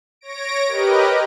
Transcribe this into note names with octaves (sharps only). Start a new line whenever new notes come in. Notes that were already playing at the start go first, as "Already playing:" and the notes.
C#5 A#6 D7
G4 A#4 B4 D#5